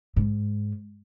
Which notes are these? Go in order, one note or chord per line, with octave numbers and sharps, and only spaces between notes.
G#2